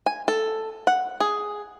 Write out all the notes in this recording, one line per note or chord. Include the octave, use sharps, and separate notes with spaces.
G#5
A4
F#5
G#4